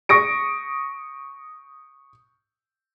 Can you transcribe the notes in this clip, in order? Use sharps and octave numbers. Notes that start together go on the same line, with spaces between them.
C#6 D#6 A#6 D7